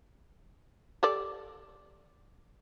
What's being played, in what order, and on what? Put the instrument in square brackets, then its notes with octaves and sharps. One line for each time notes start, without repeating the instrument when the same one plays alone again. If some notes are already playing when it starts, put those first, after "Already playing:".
[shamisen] G4 A4 D5